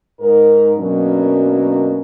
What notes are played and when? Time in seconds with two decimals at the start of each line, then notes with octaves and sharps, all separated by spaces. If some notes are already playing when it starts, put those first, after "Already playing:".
0.20 G#2 A#4
0.78 F#2 B2 F#3 A#3 C#4 D4